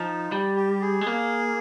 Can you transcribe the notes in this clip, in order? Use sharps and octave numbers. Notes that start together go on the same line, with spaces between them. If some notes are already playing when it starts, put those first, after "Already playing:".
Already playing: F3 D#4
G3
G4
G#4
G#3
A#3